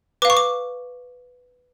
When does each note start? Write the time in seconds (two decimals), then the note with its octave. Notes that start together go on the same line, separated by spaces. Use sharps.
0.22 B4 D6
0.25 F5 C#6
0.37 D6